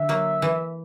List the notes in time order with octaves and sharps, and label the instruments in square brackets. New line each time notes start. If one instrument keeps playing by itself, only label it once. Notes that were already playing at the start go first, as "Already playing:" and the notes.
Already playing: [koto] D3 [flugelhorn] E5
[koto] F#3 A#3
E3